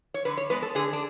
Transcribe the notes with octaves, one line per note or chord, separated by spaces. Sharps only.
C#5
D3 B4
C#5
G#3 B3 B4
A4
D3 G#4
D4